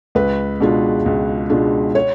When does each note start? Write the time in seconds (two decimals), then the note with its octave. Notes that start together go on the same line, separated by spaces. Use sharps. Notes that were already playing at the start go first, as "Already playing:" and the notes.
0.15 C#2 B4
0.61 B2 G#3 D4 F4
1.06 C#2
1.49 B2 G#3 D4 F4
1.95 C#5